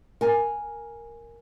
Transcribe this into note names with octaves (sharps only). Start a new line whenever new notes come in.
A#4 G#5